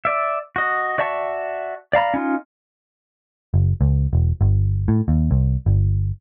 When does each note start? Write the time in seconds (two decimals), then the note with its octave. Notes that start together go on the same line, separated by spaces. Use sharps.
0.05 D5 E5
0.56 F#4 D#5
0.98 F#4 D5 E5 A5 C#6
1.93 D5 F5 A#5 B5
2.14 C#4 D#4 F4
3.54 F#1
3.81 C#2
4.13 E1
4.41 G1
4.88 A2
5.08 D#2
5.31 C2
5.66 G1